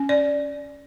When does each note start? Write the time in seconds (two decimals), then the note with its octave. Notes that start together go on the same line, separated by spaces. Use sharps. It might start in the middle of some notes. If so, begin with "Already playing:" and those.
Already playing: C#4
0.09 D5